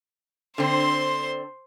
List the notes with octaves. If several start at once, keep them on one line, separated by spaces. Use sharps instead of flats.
D3 C4 C5 C6